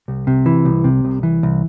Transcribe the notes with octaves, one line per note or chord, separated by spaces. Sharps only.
C2
C3
E3
C2
C3
C2
E3
C2